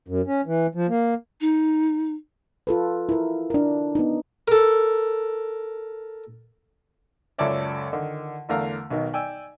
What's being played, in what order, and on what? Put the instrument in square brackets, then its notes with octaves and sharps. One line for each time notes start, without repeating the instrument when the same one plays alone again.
[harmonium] F#2
C#4
E3
F3
A#3
[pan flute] D#4
[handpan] F4 A4 B4
E4 A#4
D4 A#4
B3 D#4
[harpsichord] A4 A#4
[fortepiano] C#2 F#2 A4 C#5 D5 E5
D3 D#3
E2 D3 A3 A#4 F5 A#5
B1 B2 D#3
D5 G5 G#5 E6